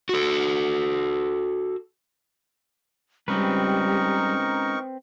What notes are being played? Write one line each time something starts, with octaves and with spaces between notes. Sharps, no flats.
F#4 A4
G3 G#3 C4 C#4 D#4 A#4 B4 C#6